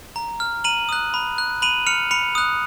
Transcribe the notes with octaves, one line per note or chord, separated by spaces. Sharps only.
A#5
F6
A#5 D#7 F#7
D#6 F#6
B5
F#6
B5 D#7 F#7
F6 C#7 F7
B5 C#7 F7
D#6 F#6